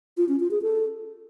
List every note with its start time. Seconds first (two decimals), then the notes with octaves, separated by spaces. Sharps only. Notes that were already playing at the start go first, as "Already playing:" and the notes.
0.17 F4
0.28 C#4
0.40 F4
0.51 G#4
0.62 A4